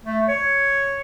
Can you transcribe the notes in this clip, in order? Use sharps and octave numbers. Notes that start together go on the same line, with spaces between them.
A3
C#5